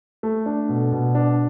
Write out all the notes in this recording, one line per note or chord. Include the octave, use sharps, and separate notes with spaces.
A3
D4
B2
B2
D4